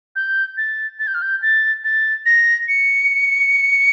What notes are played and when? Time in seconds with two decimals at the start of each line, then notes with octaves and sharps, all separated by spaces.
0.16 G6
0.57 A6
0.99 A6
1.07 G6
1.14 F6
1.22 G6
1.42 A6
1.84 A6
2.26 A#6
2.68 C#7